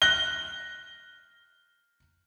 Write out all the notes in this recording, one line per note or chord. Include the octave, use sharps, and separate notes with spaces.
F#6 A#6 G7